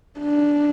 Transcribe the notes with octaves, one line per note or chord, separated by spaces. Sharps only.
D4